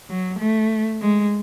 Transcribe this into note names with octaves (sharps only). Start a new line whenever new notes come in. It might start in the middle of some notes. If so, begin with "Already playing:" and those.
F#3
A3
G#3